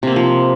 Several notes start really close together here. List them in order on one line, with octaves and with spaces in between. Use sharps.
C3 A#3 C4 F3